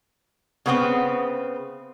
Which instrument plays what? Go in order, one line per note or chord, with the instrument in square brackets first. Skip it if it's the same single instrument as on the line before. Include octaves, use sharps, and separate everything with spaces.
[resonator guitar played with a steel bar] C#3 B3 C4